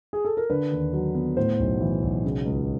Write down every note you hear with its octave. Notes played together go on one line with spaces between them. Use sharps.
G#4
A4
A#4
D3 B4
D#2
F#3
B3
A2 C5
B1
E3
B1
C#3
C#2